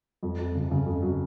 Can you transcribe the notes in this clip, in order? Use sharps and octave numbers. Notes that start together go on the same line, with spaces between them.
F2
F2
C#3
C#3
F2
F#3